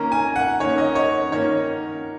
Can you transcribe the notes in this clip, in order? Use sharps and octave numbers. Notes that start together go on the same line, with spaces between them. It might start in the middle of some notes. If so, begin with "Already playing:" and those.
Already playing: D#3 A#3 C#4 A#5
G#5
F#5
D#3 A#3 C#4 C#5
D#5
C#5
D#3 A#3 C#4 C#5